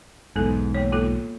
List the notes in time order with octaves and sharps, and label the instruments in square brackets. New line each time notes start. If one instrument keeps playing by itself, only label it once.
[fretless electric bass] B1 E2 G#2 [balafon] B3 A4
[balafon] A#3 C#5
A#3 F4 A4